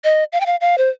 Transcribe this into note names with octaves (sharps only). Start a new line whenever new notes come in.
D#5
F5
G5
F5
F5
C5